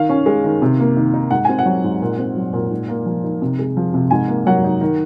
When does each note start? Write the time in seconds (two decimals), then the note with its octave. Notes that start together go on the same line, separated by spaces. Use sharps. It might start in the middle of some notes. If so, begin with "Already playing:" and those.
Already playing: D#3 F5
0.09 C#4
0.26 G#3
0.44 D#3
0.62 C3
0.79 A#3
0.97 D#3
1.14 D#4
1.31 G#2 F#5
1.45 C4 G#5
1.59 F#5
1.66 F#3
1.84 G#2
2.02 A#2
2.18 C4
2.36 F#3
2.53 A#2
2.71 G#2
2.88 A#3
3.06 F3
3.24 D#4
3.42 C3
3.59 G#3
3.77 F3
3.94 C3
4.11 G#2 G#5
4.28 A#3
4.46 F#3 F#5
4.64 D#4
4.81 D#3